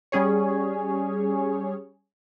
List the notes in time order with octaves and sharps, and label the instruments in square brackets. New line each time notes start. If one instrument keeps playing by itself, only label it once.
[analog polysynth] G3 C#4 G#4 C#5